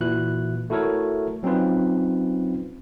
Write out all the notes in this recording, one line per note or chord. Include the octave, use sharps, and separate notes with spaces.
A#2 E3 E4 F#4 F#6
A3 E4 F#4 A4 A#4 C#5
F#3 C4 C#4 D#4 F4 B4